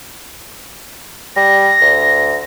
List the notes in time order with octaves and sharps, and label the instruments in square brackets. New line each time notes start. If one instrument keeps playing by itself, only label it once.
[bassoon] G3 [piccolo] A#6
[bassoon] D2